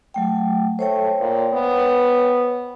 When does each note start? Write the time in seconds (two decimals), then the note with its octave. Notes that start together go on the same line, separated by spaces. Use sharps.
0.14 F#3 A3 G5
0.79 A3 C5 C#5 G5
1.20 A#2
1.54 B3